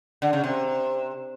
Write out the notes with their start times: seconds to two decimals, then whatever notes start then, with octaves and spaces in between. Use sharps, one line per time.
0.22 D3
0.33 C#3
0.44 C3